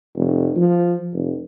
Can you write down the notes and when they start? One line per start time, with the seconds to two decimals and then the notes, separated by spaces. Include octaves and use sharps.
0.15 F1
0.56 F3
1.13 F1